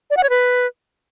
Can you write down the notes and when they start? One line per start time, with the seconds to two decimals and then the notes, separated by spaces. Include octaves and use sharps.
0.10 D5
0.17 F#5
0.23 C#5
0.30 B4